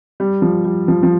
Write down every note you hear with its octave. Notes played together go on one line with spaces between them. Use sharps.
G3
F3
G3
F3
F3